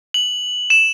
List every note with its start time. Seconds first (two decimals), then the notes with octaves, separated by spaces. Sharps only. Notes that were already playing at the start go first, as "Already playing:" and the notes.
0.14 F#7
0.70 E7